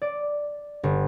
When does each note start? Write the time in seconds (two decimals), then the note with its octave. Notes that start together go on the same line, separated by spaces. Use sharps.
0.02 D5
0.83 G1